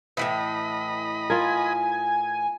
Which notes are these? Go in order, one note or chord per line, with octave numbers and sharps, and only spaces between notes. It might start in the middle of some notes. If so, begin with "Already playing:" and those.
A2 C3 E3 D#5 B5
F4 A#4 G#5